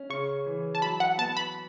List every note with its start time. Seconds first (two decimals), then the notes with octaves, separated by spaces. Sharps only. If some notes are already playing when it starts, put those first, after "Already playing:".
Already playing: C#4
0.09 C#3 C#6
0.46 E3
0.75 A5
0.82 F#3 B5
1.00 F#5
1.18 B3 A5
1.37 B5